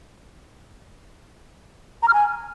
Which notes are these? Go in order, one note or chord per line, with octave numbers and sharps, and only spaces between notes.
A#5
F6
G#5